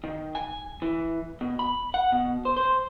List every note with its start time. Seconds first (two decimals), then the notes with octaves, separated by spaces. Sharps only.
0.04 D#3
0.35 G#5
0.82 E3
1.41 B2
1.59 B5
1.94 F#5
2.12 B2
2.45 C5
2.57 C5